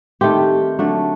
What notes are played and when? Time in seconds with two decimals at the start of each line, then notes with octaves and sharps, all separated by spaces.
0.21 D#3 A3 C4 G4
0.79 D3 F#3 A3 D4